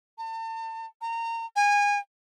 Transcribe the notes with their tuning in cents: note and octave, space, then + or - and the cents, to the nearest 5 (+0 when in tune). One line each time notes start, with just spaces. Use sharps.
A5 +40
A#5 -25
G#5 -25